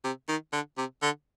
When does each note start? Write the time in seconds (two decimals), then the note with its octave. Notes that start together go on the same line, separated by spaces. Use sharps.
0.04 C3
0.29 D#3
0.53 D3
0.78 C3
1.02 D3